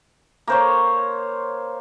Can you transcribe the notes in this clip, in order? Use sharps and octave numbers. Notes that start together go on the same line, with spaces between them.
A#3 C5 C#5